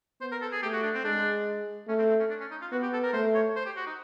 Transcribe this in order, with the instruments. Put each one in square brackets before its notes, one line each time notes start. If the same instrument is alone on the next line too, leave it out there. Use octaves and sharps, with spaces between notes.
[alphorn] B3 [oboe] C5
[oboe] A#4
A4
G#4
[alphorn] A3 [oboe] G4
[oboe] F#4
D4
C4
[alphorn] G#3 [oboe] D4
[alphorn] A3 [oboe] C#4
[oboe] C4
C4
C#4
D4
C#4
D#4
F4
[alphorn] B3 [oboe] F#4
[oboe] G4
A4
A#4
[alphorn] A3 [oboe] C5
[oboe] C#5
C5
G4
F#4
D#4